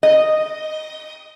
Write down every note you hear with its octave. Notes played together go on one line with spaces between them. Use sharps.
D#5